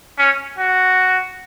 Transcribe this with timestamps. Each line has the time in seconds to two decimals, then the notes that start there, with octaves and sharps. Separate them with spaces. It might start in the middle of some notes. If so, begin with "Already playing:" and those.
0.19 C#4
0.58 F#4